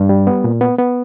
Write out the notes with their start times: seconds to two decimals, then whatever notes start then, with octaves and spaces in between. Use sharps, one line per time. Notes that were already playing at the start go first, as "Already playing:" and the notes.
Already playing: G2
0.09 G3
0.27 B3
0.44 A#2
0.61 B3
0.78 B3